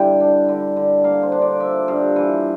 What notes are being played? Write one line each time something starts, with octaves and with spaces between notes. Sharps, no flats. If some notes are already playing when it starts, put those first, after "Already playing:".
Already playing: D3 E3 G3 G5 A5
D4
D3
D3
A#3 F5
C5
D4
D5
F3 E5
G2 F5
E3